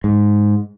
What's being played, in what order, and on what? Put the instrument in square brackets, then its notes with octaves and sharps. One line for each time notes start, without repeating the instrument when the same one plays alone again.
[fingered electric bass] G#2